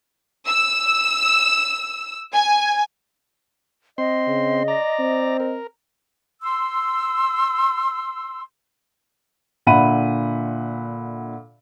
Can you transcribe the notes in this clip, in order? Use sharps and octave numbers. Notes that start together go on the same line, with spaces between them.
E6
G#5
C4 D#5 C6
C#3
D5 A#5
C4
A#4
C6 E6
A#2 D3 E5 F#5 B5 D#7